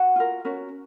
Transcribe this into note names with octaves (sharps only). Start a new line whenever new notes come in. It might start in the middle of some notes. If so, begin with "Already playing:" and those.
Already playing: F#4 F#5
F4 A#4
C#4 F#4 A#4